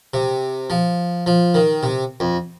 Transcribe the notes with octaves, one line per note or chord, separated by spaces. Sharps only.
C3
F3
F3
D#3
C3
F2